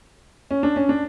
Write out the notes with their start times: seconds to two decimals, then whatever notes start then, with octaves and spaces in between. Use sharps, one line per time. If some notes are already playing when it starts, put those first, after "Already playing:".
0.51 C#4
0.63 D4
0.76 C#4
0.89 D4